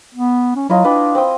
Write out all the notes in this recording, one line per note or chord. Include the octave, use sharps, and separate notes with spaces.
B3
C#4
F#3 E4 F4 D#5
D4 B4 G5
C4 G5 D#6